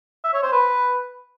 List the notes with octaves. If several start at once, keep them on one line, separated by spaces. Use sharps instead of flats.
E5
C#5
C5
B4